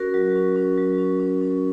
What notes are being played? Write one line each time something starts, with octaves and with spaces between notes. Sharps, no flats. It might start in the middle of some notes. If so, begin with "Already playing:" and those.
Already playing: C#4 F#4 A#4
F#3
C#4
C#4
F#3
C#4
C#4
C#4